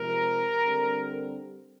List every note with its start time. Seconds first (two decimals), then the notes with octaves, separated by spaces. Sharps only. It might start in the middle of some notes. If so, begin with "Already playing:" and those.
Already playing: C3 F3 G#3 A#4
0.64 D3 G3 C4